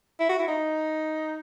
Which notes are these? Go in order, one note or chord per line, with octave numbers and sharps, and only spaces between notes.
E4
F#4
E4
D#4